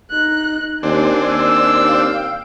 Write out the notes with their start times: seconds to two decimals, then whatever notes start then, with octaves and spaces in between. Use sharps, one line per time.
0.11 D#4 F#6
0.83 D#2 C4 D4 G#5
1.28 D#2 E6
1.85 F5 G5